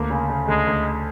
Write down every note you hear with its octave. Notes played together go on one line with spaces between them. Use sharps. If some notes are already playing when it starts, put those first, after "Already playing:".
Already playing: D2 A#3
C#3
C#3
D2 G#3
D2